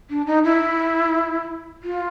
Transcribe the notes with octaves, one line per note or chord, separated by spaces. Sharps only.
D4
D#4
E4
F4